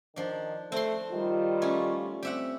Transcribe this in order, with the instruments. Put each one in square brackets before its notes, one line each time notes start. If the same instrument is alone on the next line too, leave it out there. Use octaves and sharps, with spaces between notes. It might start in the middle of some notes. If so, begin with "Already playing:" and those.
[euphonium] D#3 [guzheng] F3 D4
[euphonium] A3 [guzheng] C4 C6
[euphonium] D#3 [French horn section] G3 F4
[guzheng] A3 C#4
[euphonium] C4 [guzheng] G4 E5 F#5